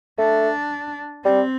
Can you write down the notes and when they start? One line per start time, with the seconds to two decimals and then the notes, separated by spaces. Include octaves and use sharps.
0.18 A3 D4
1.25 G3 C4